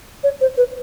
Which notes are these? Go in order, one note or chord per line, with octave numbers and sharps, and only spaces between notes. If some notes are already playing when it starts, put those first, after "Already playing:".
C#5
C5
B4